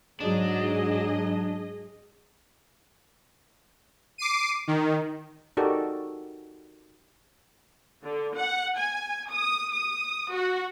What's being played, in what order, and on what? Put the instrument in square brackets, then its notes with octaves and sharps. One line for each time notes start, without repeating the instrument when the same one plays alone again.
[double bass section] G#2 F#3 [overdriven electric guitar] D4 [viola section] G#4 D#5
[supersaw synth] D6 C7 D#7
D#3
[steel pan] D#4 F#4 G4 A4 A#4 D5
[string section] D3
F#5
G#5
D#6
D#6
F#4